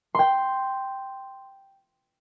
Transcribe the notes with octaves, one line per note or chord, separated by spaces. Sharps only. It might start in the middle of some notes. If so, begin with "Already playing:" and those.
G5 C6